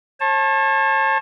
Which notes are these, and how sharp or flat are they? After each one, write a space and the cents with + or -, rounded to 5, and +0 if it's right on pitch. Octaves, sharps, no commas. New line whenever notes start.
C#5 -40 A5 +0